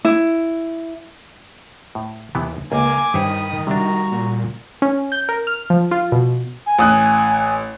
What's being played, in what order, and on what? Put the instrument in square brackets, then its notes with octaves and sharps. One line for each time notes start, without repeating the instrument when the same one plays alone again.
[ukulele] E4
[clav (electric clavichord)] A2
[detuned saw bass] D#2 [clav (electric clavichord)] C3 E3 B3
[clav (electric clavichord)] C#2 [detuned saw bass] A#3 [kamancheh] G#5 D6
[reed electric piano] G2 G5 [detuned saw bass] D#3 [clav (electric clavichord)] E4 C5 C#5 [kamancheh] B5 D#6
[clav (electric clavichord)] C3 D4 [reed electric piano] G3 [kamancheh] F#4 A#5
[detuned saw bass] A#2
[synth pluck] C#4
G6
A#4
F6
F3
F4
B2
[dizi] G#5
[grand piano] A1 D#6 F#6